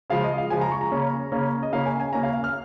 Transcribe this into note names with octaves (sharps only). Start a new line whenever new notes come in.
C#3 F3 G#3 F5
D#5
F5
C#3 F3 G#3 G#5
A#5
C#6
A#5
C#3 A#3 C#4
C#3 A#3 C#4
D#5
C#3 A#3 C#4 F5
G#5
G#5
C#3 A#3 C#4 A#5
F5
F5
F6